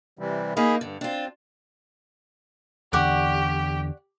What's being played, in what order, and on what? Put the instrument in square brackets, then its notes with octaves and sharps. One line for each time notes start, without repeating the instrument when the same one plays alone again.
[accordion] C3 E3 G3
[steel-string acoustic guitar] A#3 D#4 [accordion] G#4 B5
[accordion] G2 [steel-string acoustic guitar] D3
[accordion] C4 [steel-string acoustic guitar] D4 F4
[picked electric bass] E2 D3 [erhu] G4 [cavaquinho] D5 F#5 C#6